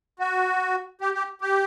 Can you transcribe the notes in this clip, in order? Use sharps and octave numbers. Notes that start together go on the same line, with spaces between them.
F#4
G4
G4
G4